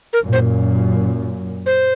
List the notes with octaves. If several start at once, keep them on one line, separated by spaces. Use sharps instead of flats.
A#4
F#2 A#2
C5
C5